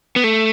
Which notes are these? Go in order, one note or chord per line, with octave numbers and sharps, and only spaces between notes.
B3
A3